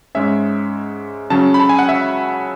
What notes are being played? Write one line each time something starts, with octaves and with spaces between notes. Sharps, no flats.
G#2 G#3 C#4 E5
C#3 F#3 C#4 A5
B5
A5
G#5
F#5
E5